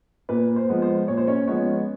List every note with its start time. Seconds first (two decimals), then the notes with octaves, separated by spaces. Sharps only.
0.29 A#2 B4
0.56 C5
0.69 F3 G#3 B3
0.82 C5
1.08 A#2 C#5
1.17 C5
1.27 C#4 C#5
1.47 F3 G#3 B3 C#4 C#5